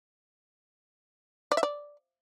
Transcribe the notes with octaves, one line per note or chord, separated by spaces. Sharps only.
D5
E5
D5